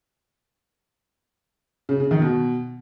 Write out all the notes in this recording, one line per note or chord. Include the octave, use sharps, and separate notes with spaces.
C#3
C#3
D#3
B2